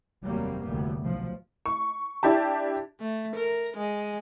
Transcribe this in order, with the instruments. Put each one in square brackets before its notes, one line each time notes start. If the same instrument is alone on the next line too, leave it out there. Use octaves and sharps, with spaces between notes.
[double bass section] F1 D#2 F#3 G3 A#3 C4
F1 D2 A2 G3 B3
B1 F3
[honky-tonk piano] C#6
D4 E4 G4 A5
[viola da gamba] A3
A#4
G#3